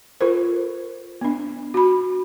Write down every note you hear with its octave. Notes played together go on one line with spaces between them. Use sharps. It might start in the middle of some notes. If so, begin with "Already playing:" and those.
F4 A4 A#4 C5
B3 D4
F#4 B5